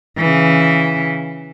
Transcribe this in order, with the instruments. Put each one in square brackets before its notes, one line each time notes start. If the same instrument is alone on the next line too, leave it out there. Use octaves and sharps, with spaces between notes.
[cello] C#3 E3